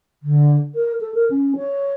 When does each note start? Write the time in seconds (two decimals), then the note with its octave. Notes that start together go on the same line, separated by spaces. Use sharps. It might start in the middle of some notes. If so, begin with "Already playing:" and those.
0.23 D3
0.75 A#4
1.01 A4
1.15 A#4
1.30 C#4
1.56 C#5